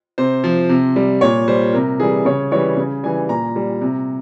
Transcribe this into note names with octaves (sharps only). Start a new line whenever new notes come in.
C3 C5
F3
C3
G3
A#2 C#5
G3 C5
C3 A#4
E3 G3 G#4
C#3 C#5
E3 G3 C#5
C#3
E3 G3 G#5
A#2 A#5
G3
C3